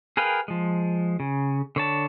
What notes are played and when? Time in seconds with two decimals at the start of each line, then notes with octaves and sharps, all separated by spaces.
0.17 G#4 A#4 B4 F5 G5
0.48 F3 G#3
1.20 C#3
1.76 D3 C#5 A5